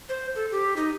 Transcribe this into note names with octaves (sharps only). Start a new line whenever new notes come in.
C5
A4
G4
D#4